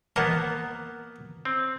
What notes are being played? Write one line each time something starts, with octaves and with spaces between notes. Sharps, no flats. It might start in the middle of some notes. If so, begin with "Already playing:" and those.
A#3 B3 A#4 F#5 A5
C4